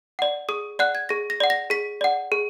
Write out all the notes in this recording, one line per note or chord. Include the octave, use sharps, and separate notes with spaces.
D5 F#5
G#4 D#6
D5 F#5 F#6
G#6
G#4 A#6
A#6
D5 F#5
A#6
G#4 B6
D5 F#5
G#4